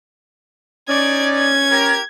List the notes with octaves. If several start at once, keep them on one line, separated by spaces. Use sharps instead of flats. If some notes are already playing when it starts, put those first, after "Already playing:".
C#4 D#4 D5 G#6
G#6
G4 A#4